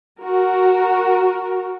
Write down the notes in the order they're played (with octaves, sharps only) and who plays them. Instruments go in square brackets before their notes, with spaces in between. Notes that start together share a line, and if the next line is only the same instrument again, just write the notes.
[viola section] F#4 A#4